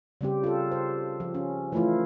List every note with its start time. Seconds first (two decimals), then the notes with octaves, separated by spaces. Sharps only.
0.21 C#3 G3 C4 G4
0.44 F4 A4
0.72 C5
1.20 F3
1.34 C#4
1.72 E3 F3 A3 E4 F4